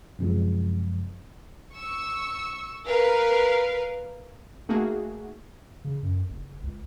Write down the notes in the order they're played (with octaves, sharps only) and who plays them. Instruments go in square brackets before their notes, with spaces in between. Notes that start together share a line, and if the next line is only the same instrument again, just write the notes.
[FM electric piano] F#2 C3 F3 G#3
[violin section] C#6 E6
A#4 B4 F5
[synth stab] A3 A#3 D#4 F#4 G#4
[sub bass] C#3
F#2
F#1
C#2